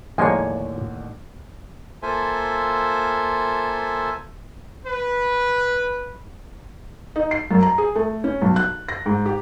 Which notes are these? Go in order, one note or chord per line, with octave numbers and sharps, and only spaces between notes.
A1 D#2 D3 F3 G#3 A#3 C#5 G#5
A#3 F4 A4 C5 E5 G#5
B4
D#4
C7
F#2
A#5
G#4
A3
C#4
B1
F#6
A#6
G#2
G4